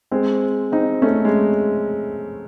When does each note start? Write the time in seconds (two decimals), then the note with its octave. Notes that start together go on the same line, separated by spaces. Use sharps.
0.11 G#3 C4
0.72 C4 D#4
1.02 A3 C#4
1.25 G#3